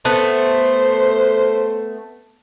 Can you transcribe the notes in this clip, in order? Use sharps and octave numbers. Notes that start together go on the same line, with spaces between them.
A3 B3 C5